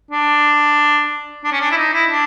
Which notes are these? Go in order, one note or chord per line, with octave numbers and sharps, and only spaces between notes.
D4
D4
C#4
D4
E4
D#4
E4
D4